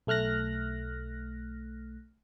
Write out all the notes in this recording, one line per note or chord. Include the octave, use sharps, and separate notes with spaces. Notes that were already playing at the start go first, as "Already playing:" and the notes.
B1 A3 F6 F#6 A#6